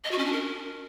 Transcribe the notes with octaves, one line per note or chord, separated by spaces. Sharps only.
D#5
F#4
C#4
D4
A#4